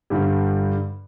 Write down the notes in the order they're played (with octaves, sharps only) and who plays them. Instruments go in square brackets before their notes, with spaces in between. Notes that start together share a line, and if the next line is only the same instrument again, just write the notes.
[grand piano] G2 D3 G3